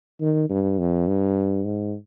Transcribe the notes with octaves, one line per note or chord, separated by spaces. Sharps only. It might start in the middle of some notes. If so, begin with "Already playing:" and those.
D#3
G2
F2
G2
G#2